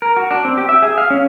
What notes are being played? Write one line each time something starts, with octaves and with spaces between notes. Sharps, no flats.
A#4
F#4
D4
C4
G4
E5
G#4
F5
C#4